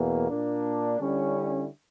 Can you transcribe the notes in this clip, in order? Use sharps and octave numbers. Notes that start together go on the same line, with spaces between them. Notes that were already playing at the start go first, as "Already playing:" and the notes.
Already playing: E2 B2 A#3
A#2 A#3 D4
D3 G3 C#4 E4